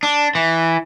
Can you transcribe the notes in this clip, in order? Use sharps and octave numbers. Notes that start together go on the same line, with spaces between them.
D4
E3